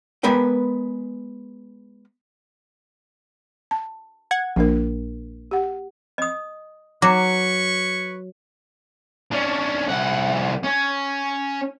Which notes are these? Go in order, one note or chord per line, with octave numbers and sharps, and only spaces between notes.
G#3 B3 A#4 B4 G5
A5
F#5 G#6
A#1 A#3 D4 A#4
G4 F#5
D#5 D#6
F#3 B4 C#5 C#6 D6
C#4 D4
C2 F#5
C#4